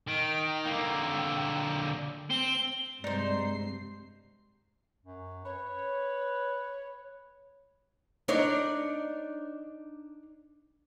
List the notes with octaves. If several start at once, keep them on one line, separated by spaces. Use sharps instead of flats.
D#3 D7
G5
D3 A#3
C4 G7
G2 C3 G#3 D#4 C5 D5 C7
F#2
B4 C#5
D4 D#4 C#5